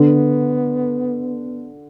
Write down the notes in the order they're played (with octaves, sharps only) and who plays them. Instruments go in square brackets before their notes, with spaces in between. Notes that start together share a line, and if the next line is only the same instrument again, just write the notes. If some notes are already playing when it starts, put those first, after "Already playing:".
Already playing: [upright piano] D3 [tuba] B3